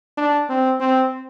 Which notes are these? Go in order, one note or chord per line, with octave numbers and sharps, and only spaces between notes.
D4
C4
C4